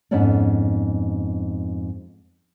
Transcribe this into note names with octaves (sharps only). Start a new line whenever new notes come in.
F2 G#2 B3 C#4 D4